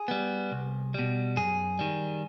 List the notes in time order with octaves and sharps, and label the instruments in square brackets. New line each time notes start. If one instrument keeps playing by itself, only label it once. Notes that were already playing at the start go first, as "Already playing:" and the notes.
Already playing: [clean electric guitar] G#4
G3 B3
C2
B2 G3
F#2 G#4
D#3 G3